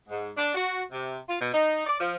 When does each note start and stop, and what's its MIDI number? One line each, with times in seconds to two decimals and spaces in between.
0.09 0.29 44
0.35 0.52 62
0.54 0.82 66
0.91 1.16 48
1.27 1.39 65
1.39 1.52 47
1.52 1.84 63
1.86 1.96 74
1.98 2.16 53